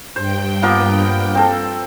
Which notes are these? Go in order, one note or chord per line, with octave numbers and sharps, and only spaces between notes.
G2 C5 G5
F3 A#3 B3
C4 A4